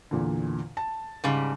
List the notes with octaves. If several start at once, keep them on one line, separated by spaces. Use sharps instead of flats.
E2 A#2 D3
A5
G#2 C#3 G3